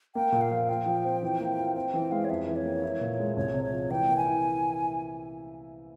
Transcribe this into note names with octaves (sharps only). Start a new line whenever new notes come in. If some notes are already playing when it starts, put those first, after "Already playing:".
A#3 G5
A#2
F5
F3
F4 G5
F3
C4
E3
A#3
F4
C4 G5
E3 G5
G#3 F5
C#5
F2 E5
E3
C#5
A#3
E4
A#2
G#3
C2 C#5
C3
C#5
F3
E3 G5
A#3
G#5
E4